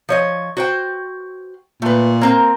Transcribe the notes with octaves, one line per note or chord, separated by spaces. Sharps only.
F3 C#5 D#5
F#4 C5 G5
A#2 A3 B4
A#3 C4 A#4